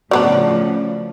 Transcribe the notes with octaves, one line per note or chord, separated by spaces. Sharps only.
A2 C#3 F3 F#3 B3 D4 D5